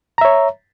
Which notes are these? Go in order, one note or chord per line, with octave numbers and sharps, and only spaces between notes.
C#5 E5 A#5